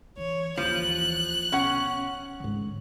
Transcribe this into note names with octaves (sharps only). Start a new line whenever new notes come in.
E3 C#5
D#2 E3 F3 F#6
B1 C#4 F#5
G#2 D3